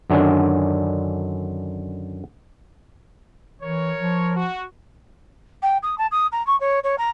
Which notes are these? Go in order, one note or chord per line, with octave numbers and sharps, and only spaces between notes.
F#2 D3 D#3 C#4 D4
E3 A#4 C#5
F3
F#4
G5
D#6
A5
D#6
A#5
C#6
C#5
C#5
A#5